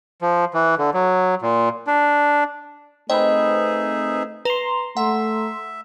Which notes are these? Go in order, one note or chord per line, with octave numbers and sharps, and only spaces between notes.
F3
E3
D3
F#3
A#2
D4
A3 C4 D#4 G#4 B4 D#5 E5
B4 A#5 C6 F7
A3 E5 F#5